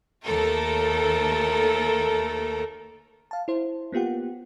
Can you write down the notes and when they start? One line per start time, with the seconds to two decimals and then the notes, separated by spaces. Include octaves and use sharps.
0.25 D#2 A3 A4 A#4
3.31 F5 A5
3.48 E4 C5
3.92 A#3 B3 F4 G4 F#5